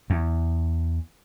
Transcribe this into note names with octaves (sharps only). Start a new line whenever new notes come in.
E2